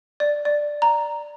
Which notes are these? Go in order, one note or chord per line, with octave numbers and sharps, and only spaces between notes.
D5
D5
A#5